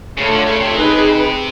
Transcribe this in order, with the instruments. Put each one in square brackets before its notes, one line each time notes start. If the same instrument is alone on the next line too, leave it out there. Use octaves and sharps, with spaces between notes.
[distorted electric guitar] C#3 [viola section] A3 D4 F4 A4 C#5
[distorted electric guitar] D3
C#3
C3
[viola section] D#4 G#4 B4